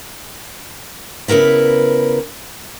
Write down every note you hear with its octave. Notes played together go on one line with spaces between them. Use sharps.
C#3 B3 E4 A#4 B4